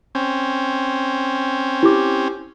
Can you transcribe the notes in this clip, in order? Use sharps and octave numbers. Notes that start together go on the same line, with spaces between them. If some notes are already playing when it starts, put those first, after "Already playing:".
C4 C#4
E4 G4 D6